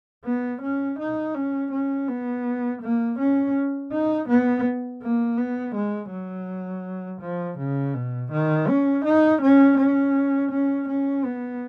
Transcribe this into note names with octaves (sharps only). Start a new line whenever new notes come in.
B3
C#4
D#4
C#4
C#4
B3
A#3
C#4
D#4
B3
A#3
B3
G#3
F#3
F3
C#3
B2
D#3
C#4
D#4
C#4
C#4
C#4
C#4
B3